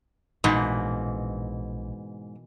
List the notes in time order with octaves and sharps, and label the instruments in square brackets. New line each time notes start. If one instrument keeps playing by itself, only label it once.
[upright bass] A#1 [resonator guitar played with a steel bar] G#2 [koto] B2 E3 A#3